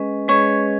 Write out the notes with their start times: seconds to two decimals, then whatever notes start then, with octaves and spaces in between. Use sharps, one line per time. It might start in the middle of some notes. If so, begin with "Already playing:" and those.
Already playing: G#3 C#4 G#4 B4 D#5
0.28 G#3 C#4 G#4 B4 C#5 D#5